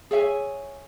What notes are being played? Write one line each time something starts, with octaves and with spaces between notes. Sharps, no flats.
G#4 C#5 E5 G#5